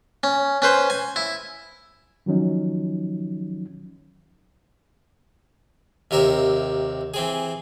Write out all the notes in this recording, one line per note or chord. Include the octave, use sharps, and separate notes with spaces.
C#4
C#4 B4 C5
G#5
E4
D#3 F3 F#3 C#4 D#4
D#2 C3 A#4 E5 A#5
E3 C4 G#4